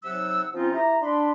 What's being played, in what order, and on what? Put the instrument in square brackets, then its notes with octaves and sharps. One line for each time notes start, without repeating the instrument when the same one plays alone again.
[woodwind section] C3 F#3 D#4 F#5 E6
F3 C4 C#4 D#4 F4
E4 G4 E5 A#5
D4 B5 C6